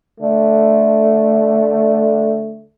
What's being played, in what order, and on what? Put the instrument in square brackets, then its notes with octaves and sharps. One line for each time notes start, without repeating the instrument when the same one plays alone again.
[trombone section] D3 A3